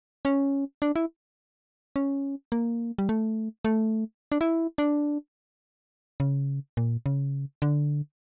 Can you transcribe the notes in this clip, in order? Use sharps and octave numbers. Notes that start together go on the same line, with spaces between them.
C#4
D4
E4
C#4
A#3
G3
A3
A3
D4
E4
D4
C#3
A#2
C#3
D3